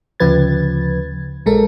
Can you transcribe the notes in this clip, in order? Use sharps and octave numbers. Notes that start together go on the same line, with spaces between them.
D2 C#3 F3 B4 G#6 A6
A#1 G#3 A4 A#4